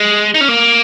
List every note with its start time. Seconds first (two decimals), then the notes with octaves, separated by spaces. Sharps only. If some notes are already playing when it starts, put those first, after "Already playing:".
Already playing: G#3
0.34 D#4
0.41 C#4
0.49 A#3